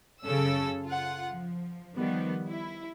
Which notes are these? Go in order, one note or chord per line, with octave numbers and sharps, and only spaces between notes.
F#2 C#3 C#4 A4 E6
F4 F#5
F3
D#3 F3 G3 B3
E4